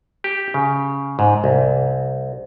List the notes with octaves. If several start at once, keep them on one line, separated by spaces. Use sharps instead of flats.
G4
C#3
G#2
C2